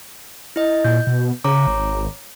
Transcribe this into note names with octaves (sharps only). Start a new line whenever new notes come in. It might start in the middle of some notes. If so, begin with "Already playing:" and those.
E4 D#5
A#2 G6
B2
C#3 C#5 A#5 D6
G#1